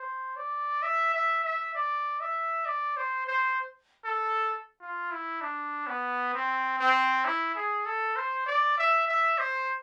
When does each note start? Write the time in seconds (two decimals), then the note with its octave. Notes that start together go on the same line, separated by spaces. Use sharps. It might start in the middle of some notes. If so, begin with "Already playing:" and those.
Already playing: C5
0.36 D5
0.82 E5
1.14 E5
1.44 E5
1.75 D5
2.21 E5
2.66 D5
2.97 C5
3.27 C5
4.04 A4
4.81 F4
5.11 E4
5.41 D4
5.87 B3
6.34 C4
6.79 C4
7.25 E4
7.55 G#4
7.86 A4
8.16 C5
8.46 D5
8.78 E5
9.08 E5
9.39 C5